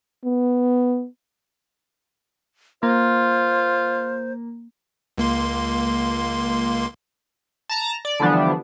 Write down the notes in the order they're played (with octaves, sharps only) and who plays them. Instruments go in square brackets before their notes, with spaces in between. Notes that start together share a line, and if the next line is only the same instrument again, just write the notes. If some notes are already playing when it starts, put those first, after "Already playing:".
[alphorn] B3
[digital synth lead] A#3 [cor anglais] F4 [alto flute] C5
[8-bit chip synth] C#2 A#3 C6
[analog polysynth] A5 A#5 A#6
D5
D3 E3 F3 G3 B3 D4